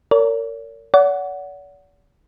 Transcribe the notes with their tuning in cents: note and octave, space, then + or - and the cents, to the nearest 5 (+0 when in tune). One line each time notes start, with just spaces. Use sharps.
A#4 -25 C#5 +40
D5 -45 F#5 +0